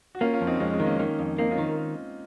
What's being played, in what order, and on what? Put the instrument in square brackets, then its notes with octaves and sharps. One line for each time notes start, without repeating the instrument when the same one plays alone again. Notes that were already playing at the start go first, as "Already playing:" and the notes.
[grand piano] F#4
[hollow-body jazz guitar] A#3 [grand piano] C#4 F4
[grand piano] C#4 F4
[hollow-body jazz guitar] F2
[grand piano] C4 D#4
C#4
[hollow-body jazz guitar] F2 [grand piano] G#3 C4
[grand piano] G#3 C4
[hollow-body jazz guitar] D#3
[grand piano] A#3 C#4
[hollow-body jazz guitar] D#3
F2
[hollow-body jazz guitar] A#3 [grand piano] C4 D#4
[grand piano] C#4 F4
[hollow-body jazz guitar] D#3